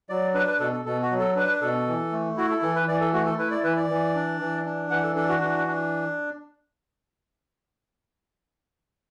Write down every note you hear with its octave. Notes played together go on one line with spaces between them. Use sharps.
F#3 D5
D4 B4
B4
B2 A4
A4
B2 A4
F#4
F#3
A4
D4 B4
B2 A4
E3
A3
E4 F#4
A4
E3 A4
B4
E3 D5
A4
A3 F#4
A4
E4 B4
D5
E3 B4
D5
E3
D4
E3
D4
E3 F#5
A4
D4 A4
F#4
E3
D4